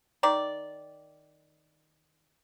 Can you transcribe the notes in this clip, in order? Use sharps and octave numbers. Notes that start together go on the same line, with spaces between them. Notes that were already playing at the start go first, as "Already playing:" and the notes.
D#3 D5